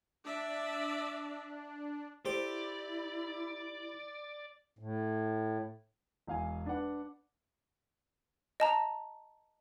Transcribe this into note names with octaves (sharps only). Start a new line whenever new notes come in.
D4 D5 E5
E4 G4 A4 C5 D5
A2
E1 F5 G#5
D4 B4 F#5
D#5 A5 A#5